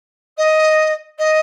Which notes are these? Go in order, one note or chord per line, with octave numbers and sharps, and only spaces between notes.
D#5
D#5